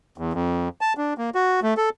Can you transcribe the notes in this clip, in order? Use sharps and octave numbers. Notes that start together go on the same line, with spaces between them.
E2
F2
A5
D4
A#3
F#4
A3
A4